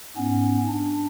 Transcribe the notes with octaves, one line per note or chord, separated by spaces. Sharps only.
G#2 B3 C#4
D4